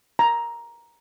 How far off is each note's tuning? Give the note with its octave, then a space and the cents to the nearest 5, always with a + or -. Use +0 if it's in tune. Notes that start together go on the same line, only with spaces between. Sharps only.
A#5 +10